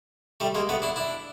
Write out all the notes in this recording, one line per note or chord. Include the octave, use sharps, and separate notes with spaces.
G3 A3
G#3 A#3
A3 B3
D4 E4
D4 E4